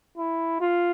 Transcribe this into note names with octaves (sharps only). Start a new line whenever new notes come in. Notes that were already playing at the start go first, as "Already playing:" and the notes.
E4
F4